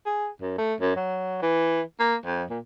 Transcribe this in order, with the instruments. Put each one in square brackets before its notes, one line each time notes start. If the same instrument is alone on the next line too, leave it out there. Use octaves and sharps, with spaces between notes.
[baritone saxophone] G#4
F#2
A3
F#2
F#3
E3
A#3
F2
A#2